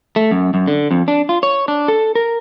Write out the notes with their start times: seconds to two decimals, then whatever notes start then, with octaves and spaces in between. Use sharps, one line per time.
0.16 A3
0.31 F#2
0.54 F#2
0.68 D3
0.91 F2
1.08 D4
1.29 F4
1.43 C#5
1.68 D4
1.88 A4
2.15 A#4